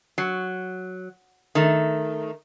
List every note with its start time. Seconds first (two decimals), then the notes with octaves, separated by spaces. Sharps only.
0.18 F#3
1.55 D#3 A3